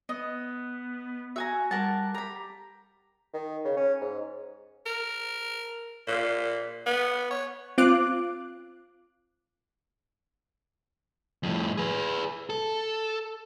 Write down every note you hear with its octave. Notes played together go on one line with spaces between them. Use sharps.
B3 D#5
F#4 E5 G#5 A#5
G3 A#4 F#5 A5
G4 A#5 B5
D#3
C#3
C#4
G#2
A#4
A#2
B3
C#5
C4 F4 D6 F#6
F2 A2
G#4 B4
A4